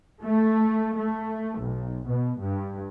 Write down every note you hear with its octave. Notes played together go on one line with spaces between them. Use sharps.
A3
A3
B1
B2
G2